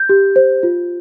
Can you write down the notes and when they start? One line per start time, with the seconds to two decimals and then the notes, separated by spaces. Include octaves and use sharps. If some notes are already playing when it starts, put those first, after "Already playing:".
Already playing: G6
0.09 G4
0.36 C5
0.63 F4